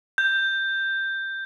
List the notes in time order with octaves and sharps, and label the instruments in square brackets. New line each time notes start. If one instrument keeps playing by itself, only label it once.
[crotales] G6